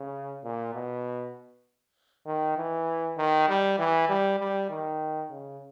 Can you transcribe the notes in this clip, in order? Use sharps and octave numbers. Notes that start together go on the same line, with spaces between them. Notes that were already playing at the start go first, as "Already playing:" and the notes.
Already playing: C#3
A#2
B2
D#3
E3
D#3
G3
E3
G3
G3
D#3
C#3